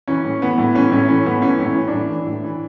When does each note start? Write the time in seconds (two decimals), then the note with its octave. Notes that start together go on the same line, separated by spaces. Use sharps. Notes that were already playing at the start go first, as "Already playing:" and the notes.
0.08 E3 C#4
0.24 A2
0.42 E3 B3
0.58 A2
0.75 E3 C#4
0.92 A2 C#4
1.08 E3 C#4
1.26 A2 B3
1.42 E3 C#4
1.60 A2
1.65 C#4
1.75 E3
1.88 A2 D4
2.10 E3
2.27 A2
2.44 E3